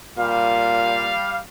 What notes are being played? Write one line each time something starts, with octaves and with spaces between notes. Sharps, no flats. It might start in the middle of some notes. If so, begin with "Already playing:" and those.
A#2 G3 F5